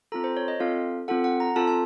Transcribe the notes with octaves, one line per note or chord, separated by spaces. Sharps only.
C4 F4 A4 A#5
C5
C#5
D#5
C4 F4 A4 F5
C4 F4 A4 F#5
F#5
A#5
C4 F4 A4 A5
A5